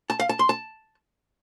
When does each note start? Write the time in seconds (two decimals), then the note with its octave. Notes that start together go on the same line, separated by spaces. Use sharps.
0.10 A5
0.20 F5
0.29 A5
0.39 C6
0.49 A5